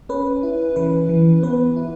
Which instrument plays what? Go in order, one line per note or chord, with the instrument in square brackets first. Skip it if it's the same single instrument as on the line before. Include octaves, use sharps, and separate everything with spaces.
[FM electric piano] C#4 B4
E4
E3 B4
E3
B3 B4
E4